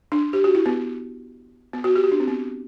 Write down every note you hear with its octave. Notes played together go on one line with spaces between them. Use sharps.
D4
G4
F#4
E4
B3
B3
F#4
G4
F#4
D4
C4
B3